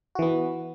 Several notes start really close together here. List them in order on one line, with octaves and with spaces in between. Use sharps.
F#4 E3 B3